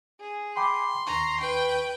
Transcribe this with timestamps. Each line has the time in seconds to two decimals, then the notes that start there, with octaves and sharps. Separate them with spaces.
0.20 G#4
0.57 G5 B5 C6 D6
1.07 D#2 A#5 C#6
1.40 B4 G5